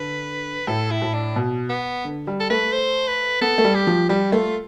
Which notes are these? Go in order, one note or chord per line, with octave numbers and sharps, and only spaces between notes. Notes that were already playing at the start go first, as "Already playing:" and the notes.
Already playing: D3 B4
A2 A4
E4
A2
D4
B2
B3
D3
G3
A4
A3 B4
C5
B4
B3 A4
A3
G3
G4
F3
G3 G4
A3 F4